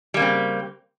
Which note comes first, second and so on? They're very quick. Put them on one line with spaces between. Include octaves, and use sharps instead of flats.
G3 A#3 C#3 C4